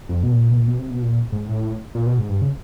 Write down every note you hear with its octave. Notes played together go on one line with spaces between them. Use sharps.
F2
B2
A#2
B2
A#2
B2
C3
B2
A#2
G#2
A2
A#2
B2
G#2
G2
C#3